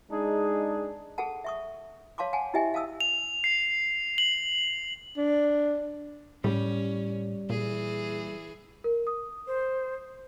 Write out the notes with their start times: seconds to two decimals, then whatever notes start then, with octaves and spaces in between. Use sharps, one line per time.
0.10 G#3 D4 D#4 G#4
1.18 G#4 A4 F#5 A5
1.44 E5 C#6 D#6
2.18 C#5 F5 A5 C6 D6
2.33 F#5 G#5 A5
2.54 E4 G4 D#5 E5 G5 G#5
2.74 F5 A5 D#6 E6
3.01 F7
3.44 C7
4.18 F#7
5.17 D4
6.44 A2 G3 C#4
7.50 A#2 E3 G#4
8.84 A#4
9.07 D#6
9.47 C5